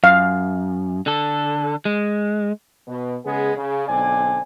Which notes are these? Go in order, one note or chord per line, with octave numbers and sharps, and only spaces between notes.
F#2 F5
D3 A4
G#3
B2
C#3 G#3 B3 G#4
C#3
B1 D3 C4 D5 G#5